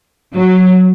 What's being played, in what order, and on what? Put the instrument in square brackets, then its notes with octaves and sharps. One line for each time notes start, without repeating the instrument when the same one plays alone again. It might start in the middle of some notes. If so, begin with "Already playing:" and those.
[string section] F#3